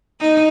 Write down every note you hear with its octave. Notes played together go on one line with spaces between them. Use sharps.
D#4